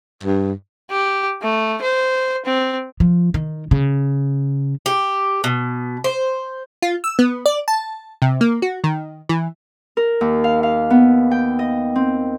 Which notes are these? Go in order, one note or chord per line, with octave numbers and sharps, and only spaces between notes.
G2
G4
A3
C5
C4
F3
D#3
C#3
G4
B2
C5
F4
E6
B3
D5
A5
C3
A#3
F#4
D#3
E3
A#4
D#2
F5
F5
B3
G5
D#5
C4